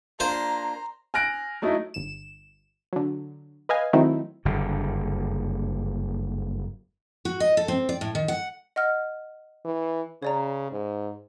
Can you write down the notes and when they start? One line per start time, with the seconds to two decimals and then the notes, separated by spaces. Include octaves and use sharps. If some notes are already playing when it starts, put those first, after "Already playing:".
0.20 A#3 D4 F4 C5 A#5
1.14 G#5 F6 F#6 A#6 D7
1.62 F#3 A3 D#4 E4
1.94 G1 E7
2.93 D3 F#3
3.69 B4 D#5 F5 G#5
3.93 D#3 F#3 A3 C4 D#4 E4
4.45 F#1 G2 D3
7.25 F#4
7.40 D#5
7.57 A4
7.68 C4
7.89 D5
8.01 A2
8.15 D#3
8.28 F#5
8.76 D#5 F#5 F6
9.65 E3
10.23 C#3 C#5 D5 A#5
10.72 G#2